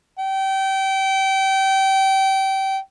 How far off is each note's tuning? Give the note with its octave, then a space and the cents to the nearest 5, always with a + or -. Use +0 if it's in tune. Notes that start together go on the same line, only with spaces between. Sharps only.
G5 -25